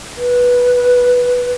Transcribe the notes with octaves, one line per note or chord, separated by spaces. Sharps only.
B4